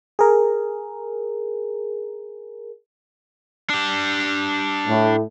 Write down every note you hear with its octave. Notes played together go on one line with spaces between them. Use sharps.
G#4 A#4
D4 G4
A2